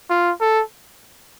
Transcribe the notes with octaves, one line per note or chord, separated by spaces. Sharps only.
F4
A4